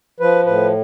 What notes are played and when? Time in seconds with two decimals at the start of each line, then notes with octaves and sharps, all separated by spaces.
0.20 F3 B4
0.45 A2 B4